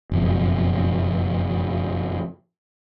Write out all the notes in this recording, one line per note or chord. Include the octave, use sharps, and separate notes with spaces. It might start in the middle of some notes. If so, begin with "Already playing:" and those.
F#1 B1 F2